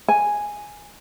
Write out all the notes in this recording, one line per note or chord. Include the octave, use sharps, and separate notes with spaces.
G#5